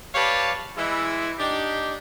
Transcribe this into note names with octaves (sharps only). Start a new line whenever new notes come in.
G4 B4 C#5 D5 F5 A5
E3 G#3 E4
D4 D#4 G4